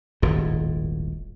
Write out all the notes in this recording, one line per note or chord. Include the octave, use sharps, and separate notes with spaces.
D#1 G#1 A2